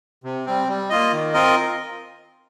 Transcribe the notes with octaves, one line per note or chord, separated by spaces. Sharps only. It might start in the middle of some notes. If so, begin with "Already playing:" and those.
C3
G3 C4
G3
A#3 F4 D#5
D#3
C4 F4 A#4 D#5